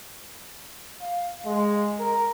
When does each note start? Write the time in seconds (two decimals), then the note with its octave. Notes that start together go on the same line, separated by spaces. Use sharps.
1.02 F5
1.46 G#3
2.00 A#4